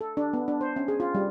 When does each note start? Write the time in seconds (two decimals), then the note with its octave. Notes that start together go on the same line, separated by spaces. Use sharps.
0.01 A4
0.17 D4
0.33 B3
0.48 D4
0.61 C5
0.76 C#4
0.88 G#4
1.00 F4
1.15 G3